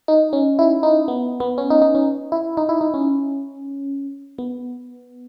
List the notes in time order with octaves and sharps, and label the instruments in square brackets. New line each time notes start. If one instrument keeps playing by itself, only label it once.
[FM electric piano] D#4
C#4
E4
D#4
B3
B3
C#4
D#4
D#4
C#4
E4
D#4
E4
D#4
C#4
B3